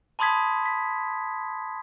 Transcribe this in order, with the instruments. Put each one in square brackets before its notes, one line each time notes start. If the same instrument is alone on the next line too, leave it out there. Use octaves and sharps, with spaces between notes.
[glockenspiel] A5 B5 C6 D#6 G#6 B6
B6